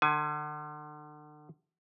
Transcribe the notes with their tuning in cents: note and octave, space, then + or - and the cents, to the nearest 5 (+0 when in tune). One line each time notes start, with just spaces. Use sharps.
D3 +40 G#5 +20